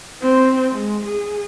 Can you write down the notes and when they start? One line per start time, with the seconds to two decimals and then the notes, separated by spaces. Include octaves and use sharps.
0.22 C4
0.75 G#3
1.05 G#4